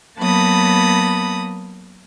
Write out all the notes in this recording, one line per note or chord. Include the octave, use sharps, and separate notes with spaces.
F#3 A#3 B3 A5 B5 D#6